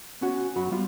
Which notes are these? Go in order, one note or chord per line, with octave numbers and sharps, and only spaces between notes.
B3 C#4 F#4
F#2 F#3 F#4 B5
G3 B3 F4